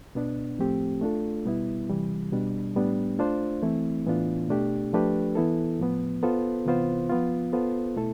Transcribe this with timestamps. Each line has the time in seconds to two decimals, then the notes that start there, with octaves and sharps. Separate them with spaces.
0.15 B2 B3 D4
0.58 A2 F3 A3 C4 G4
1.01 A3 D4 F4 A4
1.46 B2 G3 B3 E4
1.89 C3 E3 G3
2.32 B2 G3 D4
2.75 A2 G3 B3 D4 G4
3.19 A3 D4 F4 C5
3.62 E3 A3 C4 E4
4.06 A2 E3 B3 D4 F4
4.49 B2 A3 D4 G4
4.93 F3 A3 D4 G4 B4
5.35 E3 B3 E4 A4
5.79 A2 F3 B3
6.23 B3 F4 A4 C5
6.66 C3 E3 B3 F4 C5
7.10 F3 B3 F4
7.53 B3 F4 A4 C5
7.97 B2 A3 E4 A4